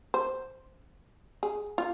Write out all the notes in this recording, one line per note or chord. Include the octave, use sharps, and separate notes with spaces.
C5
G#4
F4